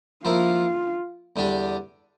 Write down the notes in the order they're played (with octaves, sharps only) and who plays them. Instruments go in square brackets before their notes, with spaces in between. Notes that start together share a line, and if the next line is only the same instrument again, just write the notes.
[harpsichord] F3 A#3 E4 A#4 [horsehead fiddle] F4
[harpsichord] E2 D3 G3 D4 G4